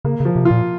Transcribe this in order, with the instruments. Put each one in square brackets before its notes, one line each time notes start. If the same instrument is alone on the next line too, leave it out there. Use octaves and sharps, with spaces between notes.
[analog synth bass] C#3 [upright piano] A#3
[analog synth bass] C#3 [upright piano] F3
[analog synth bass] C3
[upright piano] F4
[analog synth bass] A#2